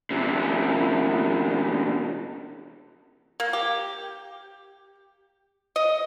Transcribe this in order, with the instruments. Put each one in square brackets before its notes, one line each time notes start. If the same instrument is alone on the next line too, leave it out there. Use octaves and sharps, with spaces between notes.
[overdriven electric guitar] E2 C3
[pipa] A#3
G4
D#5